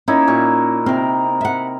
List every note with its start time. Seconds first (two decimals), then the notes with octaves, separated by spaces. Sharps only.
0.08 A#3 C#4 D#4 E4
0.28 A#2 C#6
0.86 C3 C4 A#4
1.41 E5 F#5